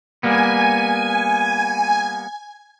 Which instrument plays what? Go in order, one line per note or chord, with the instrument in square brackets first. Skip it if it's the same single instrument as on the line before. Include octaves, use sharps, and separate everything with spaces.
[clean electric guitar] G3 A#3 B3 [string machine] G#5